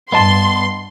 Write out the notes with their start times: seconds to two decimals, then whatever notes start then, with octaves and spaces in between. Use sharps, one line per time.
0.12 G2 B3 D#5 A5 C6